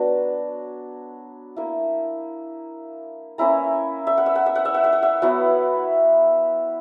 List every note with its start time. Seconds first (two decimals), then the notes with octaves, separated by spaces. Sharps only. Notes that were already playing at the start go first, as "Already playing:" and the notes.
Already playing: F#3 B3 D4
1.56 A#3 E4
3.38 A#3 C#4 E4 A#5
4.07 E5
4.17 F#5
4.26 E5
4.35 F#5
4.46 E5
4.55 F#5
4.65 E5
4.74 F#5
4.84 E5
4.93 F#5
5.03 E5
5.22 F#3 B3 E4 F#5